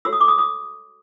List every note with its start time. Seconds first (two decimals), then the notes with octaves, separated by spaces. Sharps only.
0.05 F#4 A4 C#5 E6
0.13 D#6
0.20 D6
0.28 D#6
0.38 D#6